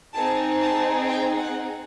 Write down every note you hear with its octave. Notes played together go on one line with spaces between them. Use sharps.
C4 D#4 G#4 A5
A5
G5
F#5